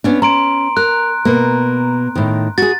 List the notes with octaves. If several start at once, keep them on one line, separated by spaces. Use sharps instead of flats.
B3 C#4 D4
C#4 A#5 C6 D7
A#4 F#6
B2 A#3
A2 D#3
F#4 G#4 A6